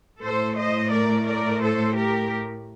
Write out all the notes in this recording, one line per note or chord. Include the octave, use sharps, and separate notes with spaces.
A2 A3 A4 C5
C5 D#5
A#4 D5
A#4 D5
A4 C5
G4 A#4